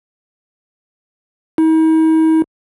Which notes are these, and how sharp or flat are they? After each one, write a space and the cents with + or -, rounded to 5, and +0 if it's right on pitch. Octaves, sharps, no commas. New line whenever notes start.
D#4 +45